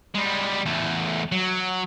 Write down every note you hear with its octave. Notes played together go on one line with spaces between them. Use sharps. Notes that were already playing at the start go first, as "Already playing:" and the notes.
G3 G#3
E2 A3
F#3